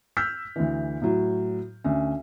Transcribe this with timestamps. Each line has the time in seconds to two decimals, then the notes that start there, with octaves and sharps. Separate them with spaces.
0.17 E6 F6 G6 B6
0.56 D2 E3
1.02 A2 F#3
1.84 D2 C#4